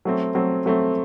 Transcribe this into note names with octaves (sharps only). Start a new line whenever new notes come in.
F#3 A3 C4
F#3 A3 C4
F#3 A3 C4